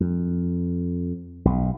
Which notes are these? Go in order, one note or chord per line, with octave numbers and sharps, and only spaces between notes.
F2
B1